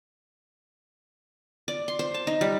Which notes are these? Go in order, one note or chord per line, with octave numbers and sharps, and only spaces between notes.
D5
C6
C5
A5
D#4
G3